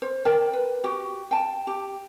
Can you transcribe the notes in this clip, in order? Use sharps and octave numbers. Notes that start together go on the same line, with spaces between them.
C5
A#4 D5 G5 A5
B4
F#4 G4
G5 A5
G4